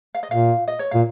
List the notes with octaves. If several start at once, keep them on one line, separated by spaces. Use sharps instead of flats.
F5
D#5
A#2 F5
D#5
C#5
A#2 F5